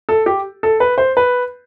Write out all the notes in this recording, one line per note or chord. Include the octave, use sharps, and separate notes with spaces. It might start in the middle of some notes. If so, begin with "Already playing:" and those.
A4
G4
A4
B4
C5
B4